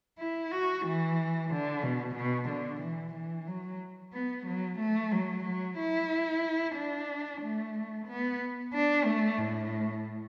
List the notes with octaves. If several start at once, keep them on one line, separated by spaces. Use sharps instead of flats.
E4
F#4
E3
D3
B2
B2
D3
E3
E3
F#3
B3
F#3
A3
F#3
F#3
E4
D4
A3
B3
D4
A3
A2